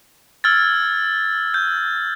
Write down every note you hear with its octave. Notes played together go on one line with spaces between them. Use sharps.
E6 F6 G#6 A6
G6